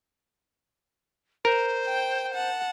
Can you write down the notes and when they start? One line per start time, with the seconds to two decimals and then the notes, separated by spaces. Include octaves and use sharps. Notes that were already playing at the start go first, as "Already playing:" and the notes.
1.45 A#4 C5
1.85 G5
2.34 F#5 A5